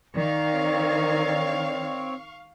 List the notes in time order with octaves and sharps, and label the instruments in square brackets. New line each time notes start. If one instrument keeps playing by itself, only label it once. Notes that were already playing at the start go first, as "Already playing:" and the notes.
[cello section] D#3 [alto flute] D5 [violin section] F5 C#6
[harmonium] C4 C#5